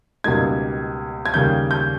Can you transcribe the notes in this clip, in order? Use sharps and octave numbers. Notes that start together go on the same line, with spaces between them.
C#2 B2 G3 A#3 D#4 G#6
G#6
D#2 C#3 G3 A#3 G6
G6